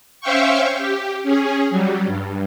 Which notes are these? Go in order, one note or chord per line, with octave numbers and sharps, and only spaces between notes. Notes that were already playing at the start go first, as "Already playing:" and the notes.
C#4 C5 E5 F5 G5 C#6
G4
C#4 G#4
F#3 G3
G2